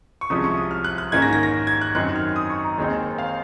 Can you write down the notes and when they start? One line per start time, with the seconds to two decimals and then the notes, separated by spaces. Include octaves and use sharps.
0.21 C#6
0.30 C2 C3 F3 G#3 C#4 D#6
0.44 C#6
0.57 D#6
0.71 F6
0.84 F#6
0.98 F#6
1.12 G#2 D#3 A#3 C#4 G#6
1.22 A#6
1.33 A#6
1.43 A#6
1.67 G#6
1.81 F#6
1.95 F#2 D#3 F#3 C4 D#4 F#6
2.16 F6
2.36 D#6
2.50 C#6
2.64 A#5
2.78 D#2 D#3 G#3 C4 D#4
3.18 F5